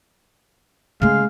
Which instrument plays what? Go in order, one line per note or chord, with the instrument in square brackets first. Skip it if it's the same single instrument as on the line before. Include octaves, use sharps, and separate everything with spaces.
[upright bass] C#3 A3 [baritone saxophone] G#3 [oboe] F5